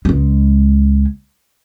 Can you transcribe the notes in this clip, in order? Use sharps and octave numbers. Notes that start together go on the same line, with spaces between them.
C#2 G#3